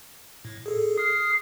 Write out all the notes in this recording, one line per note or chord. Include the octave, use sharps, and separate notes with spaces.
A2
G#4 A4
D#6 F6 C7